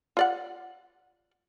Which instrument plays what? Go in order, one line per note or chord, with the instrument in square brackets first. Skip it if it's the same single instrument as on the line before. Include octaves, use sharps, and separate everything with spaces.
[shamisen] F4 D5 F#5